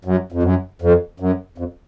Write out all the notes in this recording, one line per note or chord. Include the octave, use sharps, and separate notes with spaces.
F#2
F2
F#2
F2
F#2
F2